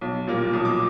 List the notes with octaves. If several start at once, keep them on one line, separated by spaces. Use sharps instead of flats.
B1
A#2 G3 A#3
B1 D#6
D6